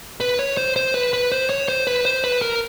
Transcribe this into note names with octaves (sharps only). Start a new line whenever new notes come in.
B4
C#5
C5
C5
B4
B4
C5
C#5
C5
B4
C5
B4
A#4